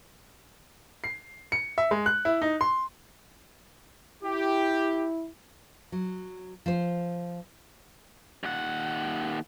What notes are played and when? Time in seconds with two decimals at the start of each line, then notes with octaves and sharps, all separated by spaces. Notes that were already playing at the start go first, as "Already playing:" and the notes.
1.04 C7
1.52 C#7
1.78 E5
1.91 G#3
2.06 F#6
2.25 E4
2.42 D#4
2.61 C6
4.24 E4 G4
5.92 F#3
6.66 F3 C5
8.43 D#2 F#5